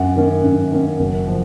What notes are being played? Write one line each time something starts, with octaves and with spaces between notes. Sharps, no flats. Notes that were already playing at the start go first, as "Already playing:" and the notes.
Already playing: F#2 F#5
D#3 A#3 C#4
F#2
D#3 A#3 C#4
F#1
F3